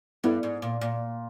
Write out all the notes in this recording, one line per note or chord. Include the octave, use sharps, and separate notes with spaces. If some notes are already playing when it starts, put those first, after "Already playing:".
G2 B3 E4 A4
G#2
A#2
A#2